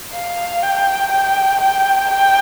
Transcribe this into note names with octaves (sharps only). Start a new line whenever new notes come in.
F5
G5
G5
G5
G5